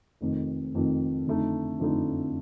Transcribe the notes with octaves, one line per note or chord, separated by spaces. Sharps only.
F1 F2 D#3
F1 F2 D#3
F2 D3 A3 D#4
F2 D3 A3 D#4